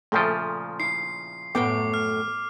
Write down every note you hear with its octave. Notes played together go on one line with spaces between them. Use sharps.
A#2 C#3 F3 A3 A4 G5
E4 C7
F#2 A2 A3 B3 G5 D6
F6